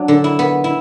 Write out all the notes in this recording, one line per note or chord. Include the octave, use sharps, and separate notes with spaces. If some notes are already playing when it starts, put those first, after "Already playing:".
Already playing: F#3 D4
D3
E4
B3
E4